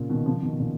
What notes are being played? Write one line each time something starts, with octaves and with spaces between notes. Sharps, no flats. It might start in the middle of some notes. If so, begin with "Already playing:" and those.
Already playing: A#2 C#3
B2 D#3
C#3 F3
B2 D#3
A#2 C#3